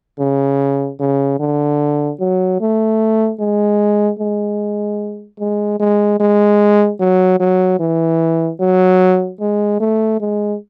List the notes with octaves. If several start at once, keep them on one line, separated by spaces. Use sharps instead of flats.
C#3
C#3
D3
F#3
A3
G#3
G#3
G#3
G#3
G#3
F#3
F#3
E3
F#3
G#3
A3
G#3